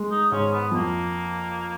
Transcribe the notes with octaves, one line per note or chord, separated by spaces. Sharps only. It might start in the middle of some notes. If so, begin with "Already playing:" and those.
Already playing: G#3
D#4
G#2 C#4
B3
F2 A#3